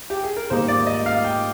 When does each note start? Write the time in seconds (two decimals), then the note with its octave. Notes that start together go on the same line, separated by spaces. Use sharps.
0.10 G4
0.24 G#4
0.37 A#4
0.50 G#2 D#3 G3 A#3 D#4 C5
0.68 D5
0.87 D#5
1.06 F5
1.24 G5